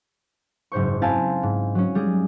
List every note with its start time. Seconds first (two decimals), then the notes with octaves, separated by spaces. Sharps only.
0.72 F#1 G#2 C5 C#6
1.02 C4 E4 F5 G#5 A5
1.43 G#2
1.75 F#3 C#4
1.95 G3 G#3 G#4